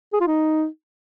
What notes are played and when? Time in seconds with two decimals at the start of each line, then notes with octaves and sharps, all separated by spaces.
0.14 G#4
0.21 F4
0.27 D#4